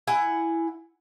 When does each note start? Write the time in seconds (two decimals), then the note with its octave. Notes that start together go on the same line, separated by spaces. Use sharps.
0.07 E4 F#5 G#5